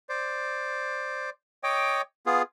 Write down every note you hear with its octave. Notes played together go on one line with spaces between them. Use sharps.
C5 D5
C#5 D#5 G5 D6
B3 F4 G#4